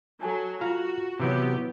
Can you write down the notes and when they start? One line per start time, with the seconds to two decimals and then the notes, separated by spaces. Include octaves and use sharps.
0.21 F#3 A4 G#5 A5
0.61 F4 F#4 F5 A#5
1.20 C3 E3 F#3 B3 G4